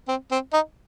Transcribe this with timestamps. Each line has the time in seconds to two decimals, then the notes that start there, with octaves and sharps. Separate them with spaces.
0.08 C4
0.31 C4
0.53 D#4